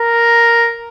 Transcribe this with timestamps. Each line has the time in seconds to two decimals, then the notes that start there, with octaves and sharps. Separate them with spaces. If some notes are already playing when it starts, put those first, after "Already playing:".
Already playing: A#4